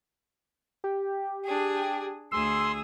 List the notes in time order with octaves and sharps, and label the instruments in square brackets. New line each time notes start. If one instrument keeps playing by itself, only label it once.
[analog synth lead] G4
[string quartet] D4 G#4
[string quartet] D2 G#4 [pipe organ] C6 [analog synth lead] E6